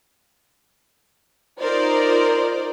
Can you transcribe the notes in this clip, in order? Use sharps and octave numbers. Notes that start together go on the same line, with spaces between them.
D#4 F4 A#4 C5 D5